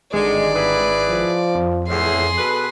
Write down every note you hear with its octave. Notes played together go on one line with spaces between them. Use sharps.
G#1 G2 D3 D#3 G#3 D5
E4 G#4 B4
F3
F2
E2 A2 G#4 C6
B2 A4 B4